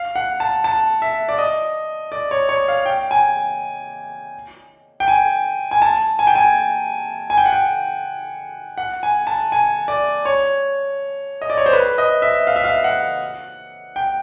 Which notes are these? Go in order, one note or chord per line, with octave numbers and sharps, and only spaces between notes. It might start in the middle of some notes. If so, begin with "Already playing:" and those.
Already playing: F5
F#5
A5
A5
E5
D5
D#5
D5
C#5
C#5
F5
G5
G#5
G5
G#5
G#5
A5
G#5
G5
G#5
G#5
G5
F#5
G5
F#5
G#5
A5
G#5
D5
C#5
D#5
D5
C#5
C5
B4
D#5
E5
F5
E5
F5
F#5
G5